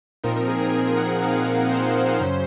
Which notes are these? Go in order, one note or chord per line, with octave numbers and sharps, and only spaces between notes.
A#2 F3 C4 D#4 A#4
A#4
G#4
A#4
G#4
A#4
F#5
F5
G#4
A#4
C5
F#2 C#3 F#3 C#4